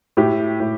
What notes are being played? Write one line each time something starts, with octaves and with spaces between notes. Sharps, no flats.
A2 G4
A2